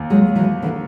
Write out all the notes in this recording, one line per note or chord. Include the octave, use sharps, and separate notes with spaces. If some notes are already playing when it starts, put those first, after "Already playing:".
Already playing: D#2
F#3 G#3
E3 F#3
D3 E3